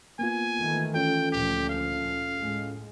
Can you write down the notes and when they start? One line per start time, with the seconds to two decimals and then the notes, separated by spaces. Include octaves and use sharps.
0.19 A#3 B3 F4 G#5
0.59 D#3 E3 A3
0.94 C#4 F4 A4 G5
1.32 D2 A#2 F3 G4
1.70 F5
2.39 A2 G#3